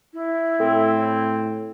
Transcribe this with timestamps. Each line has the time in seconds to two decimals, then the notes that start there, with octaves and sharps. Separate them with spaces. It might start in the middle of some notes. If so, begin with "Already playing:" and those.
0.13 E4
0.60 A2 C4 A4